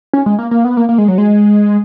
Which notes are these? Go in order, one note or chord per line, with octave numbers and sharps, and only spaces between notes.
C#4
G#3
A#3
A#3
B3
A#3
A#3
G#3
F#3
G#3